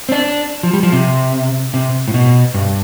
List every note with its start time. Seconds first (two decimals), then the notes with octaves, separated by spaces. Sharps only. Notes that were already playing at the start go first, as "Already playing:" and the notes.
0.09 C4
0.12 D4
0.63 F3
0.73 G3
0.83 F3
0.92 C3
1.74 C3
2.08 A2
2.14 B2
2.54 G2